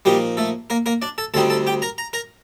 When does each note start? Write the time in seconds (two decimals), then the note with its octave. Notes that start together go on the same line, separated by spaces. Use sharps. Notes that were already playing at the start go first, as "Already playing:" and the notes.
0.05 A#2 F3 G3 A#3 D#4 G4
0.37 A3 A4
0.70 A#3 A#4
0.86 A#3 A#4
1.02 D4 D5
1.18 A4 A5
1.34 D2 D3 G3 C4 D#4 A4 A5
1.50 A4 A5
1.67 G4 G5
1.82 A#4 A#5
1.98 A#5
2.13 A#4 A#5